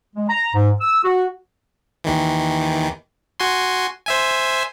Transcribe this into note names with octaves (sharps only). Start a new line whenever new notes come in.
G#3
A#5
G#2
E6
F#4
D#2 D#3 E3
F#4 G#5 C6
C5 E5 G#5